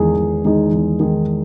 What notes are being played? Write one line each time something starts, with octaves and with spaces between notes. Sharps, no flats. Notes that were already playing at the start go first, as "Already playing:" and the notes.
Already playing: E2 D#3 G#3 D#4 G#4
E2
D#3 G#3 D#4 G#4
E2
D#3 G#3 D#4 G#4